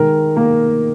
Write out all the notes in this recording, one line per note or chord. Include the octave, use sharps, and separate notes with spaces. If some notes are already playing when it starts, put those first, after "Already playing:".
Already playing: D#3 G#3 A#4
A#3